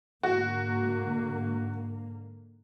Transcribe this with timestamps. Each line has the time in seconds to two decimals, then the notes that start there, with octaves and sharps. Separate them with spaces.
0.23 G#2 D3 A#3 F#4